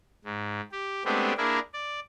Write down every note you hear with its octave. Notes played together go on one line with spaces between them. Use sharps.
G#2
G4
G#3 A3 B3 C4 D4 G4
A#3 D4 E4 G#4 A#4
D5